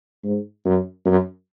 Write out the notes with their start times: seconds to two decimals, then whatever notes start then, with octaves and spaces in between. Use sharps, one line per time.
0.24 G#2
0.65 F#2
1.05 F#2